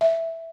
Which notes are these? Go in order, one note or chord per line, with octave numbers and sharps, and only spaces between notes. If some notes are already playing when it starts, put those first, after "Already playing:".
E5